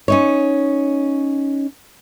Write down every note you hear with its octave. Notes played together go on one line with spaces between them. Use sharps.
C#4 D#4 C#5